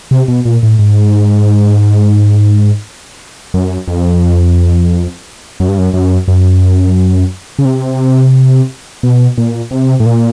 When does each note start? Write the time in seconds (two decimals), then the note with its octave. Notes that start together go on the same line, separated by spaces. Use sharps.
0.11 C3
0.28 B2
0.45 A#2
0.63 A2
0.79 G#2
3.54 F#2
3.88 F2
5.60 F#2
5.69 G2
5.78 F#2
5.94 F#2
6.28 F#2
7.59 C#3
7.65 C3
9.03 B2
9.38 A#2
9.71 C3
10.00 A2
10.06 A#2